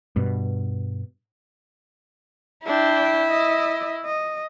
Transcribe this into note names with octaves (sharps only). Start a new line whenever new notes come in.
G2 B2
D4 E4 G5
D#5
D#5